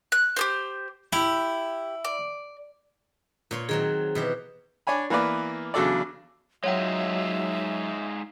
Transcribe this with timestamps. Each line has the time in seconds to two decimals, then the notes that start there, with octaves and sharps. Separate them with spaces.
0.12 F#6
0.36 G4 G#4 C5
1.13 E4 G4
2.05 D5
3.51 A#2 C#5 C6
3.69 D#3 F#3 C4 G#4
4.15 B2 E3 G4
4.87 D4 C#5 G#5 B5
5.10 E3 A#3 B3 B4 D5
5.74 E2 C#3 F#3 D4 A4 D5
6.64 F#3 G#3 D#4 F4 C#5 E5 F#5 G5